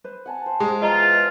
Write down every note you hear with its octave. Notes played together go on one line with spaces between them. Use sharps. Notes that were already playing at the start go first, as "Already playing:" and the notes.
B4 C5
F#5 G#5 A5
C5
G#3 C5 G5 A5
E2 F4 D#5 A#5